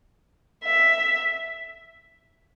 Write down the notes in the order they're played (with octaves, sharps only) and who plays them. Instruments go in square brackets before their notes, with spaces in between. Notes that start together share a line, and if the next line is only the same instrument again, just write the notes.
[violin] E5